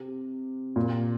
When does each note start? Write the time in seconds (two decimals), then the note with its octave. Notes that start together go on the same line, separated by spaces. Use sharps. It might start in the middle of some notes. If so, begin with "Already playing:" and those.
Already playing: C3
0.76 A#2